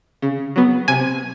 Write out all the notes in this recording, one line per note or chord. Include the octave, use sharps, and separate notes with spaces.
C#3
F#3 B3
C3 G#5